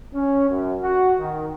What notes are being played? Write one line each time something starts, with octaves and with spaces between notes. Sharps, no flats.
C#4
F#2
F#4
D#3